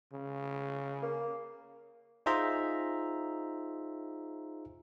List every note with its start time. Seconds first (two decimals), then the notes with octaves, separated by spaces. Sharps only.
0.13 C#3
1.03 A#3
2.26 D#4 F4 G#4 C5 E5 A#5